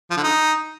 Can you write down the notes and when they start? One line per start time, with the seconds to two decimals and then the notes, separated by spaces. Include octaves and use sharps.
0.11 F3
0.17 D3
0.23 D#4